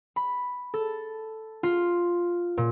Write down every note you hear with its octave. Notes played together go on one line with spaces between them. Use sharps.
B5
A4
F4
A#2